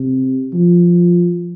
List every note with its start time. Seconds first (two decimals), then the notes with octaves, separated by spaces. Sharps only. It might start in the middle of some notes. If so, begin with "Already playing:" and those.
Already playing: C3
0.54 F3